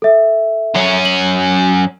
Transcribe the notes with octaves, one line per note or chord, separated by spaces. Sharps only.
A4 E5
F#2 C#4
F#7